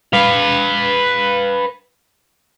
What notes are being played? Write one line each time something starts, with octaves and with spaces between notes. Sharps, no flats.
B4 F5